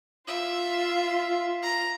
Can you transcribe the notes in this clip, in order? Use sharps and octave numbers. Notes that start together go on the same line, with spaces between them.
F4 E5
A#5